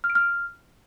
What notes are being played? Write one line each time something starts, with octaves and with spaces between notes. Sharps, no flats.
F6
D7
F6